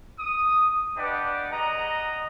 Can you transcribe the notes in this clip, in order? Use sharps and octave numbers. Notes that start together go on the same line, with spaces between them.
D#6
D4 G4 B4 D5 D#5 F#5
G#4 D#5 F#5 A#5